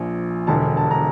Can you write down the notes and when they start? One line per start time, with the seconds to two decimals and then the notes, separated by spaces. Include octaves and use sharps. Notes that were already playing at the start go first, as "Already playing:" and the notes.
Already playing: A#1 A#2 F3
0.47 E1 E2 D3 A5
0.77 A5
0.91 A#5